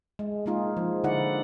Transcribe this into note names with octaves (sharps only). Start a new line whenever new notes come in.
G#3
G#3 A#3 D#4 F4 G#4
F3
D3 D#4 E4 D5 F#5